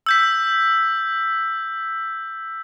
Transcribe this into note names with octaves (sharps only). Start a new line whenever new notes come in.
E6 G6 B6